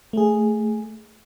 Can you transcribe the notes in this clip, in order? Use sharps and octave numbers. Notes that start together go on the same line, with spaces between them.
A3 G#4